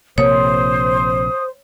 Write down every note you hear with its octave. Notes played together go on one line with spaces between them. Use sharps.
A#1 C3 A#3 C5 C#5 D#6